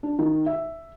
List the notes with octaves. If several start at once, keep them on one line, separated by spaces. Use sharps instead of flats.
D4
D#3
E5